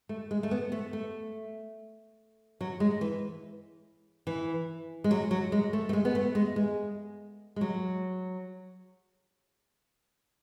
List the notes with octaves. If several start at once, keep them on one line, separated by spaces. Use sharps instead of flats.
A3
G#3
A3
B3
A3
A3
F#3
G#3
E3
E3
G#3
F#3
F#3
G#3
A3
A3
G#3
B3
A3
G#3
G#3
G#3
F#3